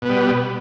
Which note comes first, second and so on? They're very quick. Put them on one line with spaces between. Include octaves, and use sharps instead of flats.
B2 B3 G3